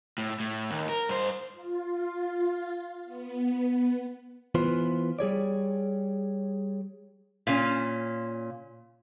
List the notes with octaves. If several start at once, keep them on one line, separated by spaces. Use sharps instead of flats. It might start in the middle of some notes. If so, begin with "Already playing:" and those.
A2
A2
D#2
A#4
G2 C5
F4
B3
E3 B3 F4 B4 C5
G3 G#4 C#5 D5
A#2 C#4